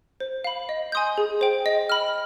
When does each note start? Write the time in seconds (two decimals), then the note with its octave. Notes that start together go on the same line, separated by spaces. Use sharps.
0.20 C5
0.44 F5 B5
0.69 D#5
0.92 G#5 C6 D#6 G6
1.18 G#4
1.41 C5 G5
1.66 D#5
1.89 B5 F6